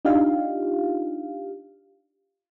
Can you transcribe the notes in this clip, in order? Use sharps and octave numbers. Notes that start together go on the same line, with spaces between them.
D4 D#4 F4 G4 F5